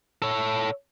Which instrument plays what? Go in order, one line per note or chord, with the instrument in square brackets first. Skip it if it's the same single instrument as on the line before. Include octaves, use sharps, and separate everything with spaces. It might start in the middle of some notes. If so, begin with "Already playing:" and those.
[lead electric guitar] A4 C#5